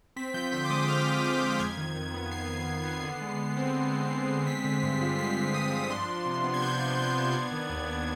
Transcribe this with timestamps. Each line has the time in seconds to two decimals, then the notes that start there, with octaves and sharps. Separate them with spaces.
0.16 C4 B6
0.34 F3 G6
0.52 D3 C6
0.65 D6
0.70 G#3 D#6
0.88 C4 F6
1.06 F3
1.24 D3
1.42 G#3
1.60 F2 G#6
1.77 D#3
1.96 F2
2.14 B3
2.31 F2 C7
2.50 D#3
2.68 F2
2.85 B3
3.03 D3
3.21 G#3
3.39 D3
3.57 C4
3.75 D3
3.93 G#3
4.11 D3
4.29 C4
4.47 G#3 B6
4.64 D3
4.82 G2 C7
5.01 F3
5.18 G#3 C7
5.36 D3
5.54 G2 D#6
5.72 F3
5.90 D4 C6
6.08 F3
6.26 C3
6.44 B3
6.54 G#6
6.62 D4 G6
6.80 F3
6.98 C3 G#6
7.16 B3
7.34 D4
7.52 D#3
7.70 D#2
7.87 B3